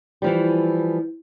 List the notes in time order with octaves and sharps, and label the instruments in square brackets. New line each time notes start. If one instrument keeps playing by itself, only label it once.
[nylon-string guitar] E3 F3 G3